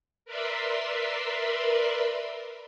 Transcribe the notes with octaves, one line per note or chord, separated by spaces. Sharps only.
A#4 B4 D5 E5 B5 C6